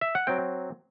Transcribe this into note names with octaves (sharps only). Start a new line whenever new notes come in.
E5
F#5
F#3 C4 G5